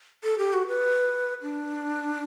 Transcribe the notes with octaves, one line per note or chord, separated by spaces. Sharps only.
A4
G4
F#4
B4
D4